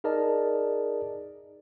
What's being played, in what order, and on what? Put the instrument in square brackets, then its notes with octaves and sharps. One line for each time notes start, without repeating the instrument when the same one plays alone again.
[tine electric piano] D#4 G#4 A#4 D5 D#5 A5